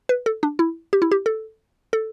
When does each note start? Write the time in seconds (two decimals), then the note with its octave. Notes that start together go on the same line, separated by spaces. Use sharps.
0.09 B4
0.26 A4
0.43 D4
0.59 E4
0.93 G4
1.02 E4
1.12 G4
1.26 A4
1.93 A4